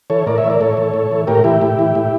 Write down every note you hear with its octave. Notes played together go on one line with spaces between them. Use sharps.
E3 A4 C#5
A2 A#4 D5
C#5 E5
E3
A#4 D5
A2 A4 C#5
E3
A2
E3
A2 G4 A#4
E3 E4 G4
A2
E3
A2